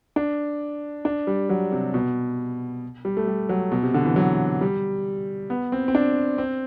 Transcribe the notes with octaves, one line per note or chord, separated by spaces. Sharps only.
D4
D4
G3
F#3
C3
B2
G3
A3
G3
F#3
B2
C3
D3
E3
F#3
G3
B3
C4
C4
D4
C4